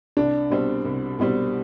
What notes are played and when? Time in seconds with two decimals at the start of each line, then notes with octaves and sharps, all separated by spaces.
0.17 C2 D4
0.50 B2 G3 C4
0.85 C2
1.19 B2 G3 C4